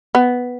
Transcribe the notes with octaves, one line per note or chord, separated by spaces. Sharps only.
B3